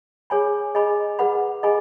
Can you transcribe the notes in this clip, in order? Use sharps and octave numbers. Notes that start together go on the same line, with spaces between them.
G#4 C#5 G#5 B5
G#4 D#5 G#5 B5
G#4 B4 F#5 B5
G#4 D#5 G#5 B5